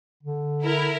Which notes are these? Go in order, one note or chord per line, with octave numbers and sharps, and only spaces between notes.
D3
E4 A#4